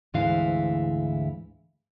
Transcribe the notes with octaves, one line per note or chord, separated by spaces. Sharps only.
D2 G#2 E3 E4 F5